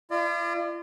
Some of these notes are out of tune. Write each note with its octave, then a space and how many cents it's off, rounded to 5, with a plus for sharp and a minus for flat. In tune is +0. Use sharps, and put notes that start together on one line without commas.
F4 -40 D5 +35